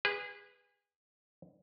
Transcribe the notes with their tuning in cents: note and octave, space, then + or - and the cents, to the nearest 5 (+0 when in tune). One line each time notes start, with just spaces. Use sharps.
G#4 -30 B4 +0